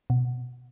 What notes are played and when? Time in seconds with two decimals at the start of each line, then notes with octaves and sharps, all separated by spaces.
0.10 B2